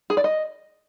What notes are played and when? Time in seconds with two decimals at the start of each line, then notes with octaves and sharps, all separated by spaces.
0.10 G#4
0.17 D5
0.24 D#5